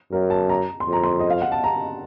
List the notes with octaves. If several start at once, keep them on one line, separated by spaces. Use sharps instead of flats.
F#2 A#4
A5
A#5
C6
F2
A#5
C6
D#5
F5
F#5
A5
A#5